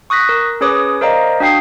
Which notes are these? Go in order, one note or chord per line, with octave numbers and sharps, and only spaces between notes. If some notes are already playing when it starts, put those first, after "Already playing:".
C#6 D#6 F#6 A#6 B6
A#4
C#4 G#4 B4 C#5 D6 D#6
A#4 C5 D5 D#5 F5 A#5
D4 F#4 F5 G5 D#6 C7